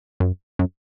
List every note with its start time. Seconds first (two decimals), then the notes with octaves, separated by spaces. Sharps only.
0.20 F#2
0.59 F#2